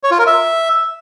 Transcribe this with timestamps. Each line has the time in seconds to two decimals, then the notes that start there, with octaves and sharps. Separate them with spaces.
0.03 C#5
0.11 F4
0.19 A#4
0.26 E5